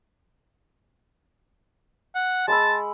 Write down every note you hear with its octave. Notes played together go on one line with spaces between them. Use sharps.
F#5
G#3 A5 B5 E6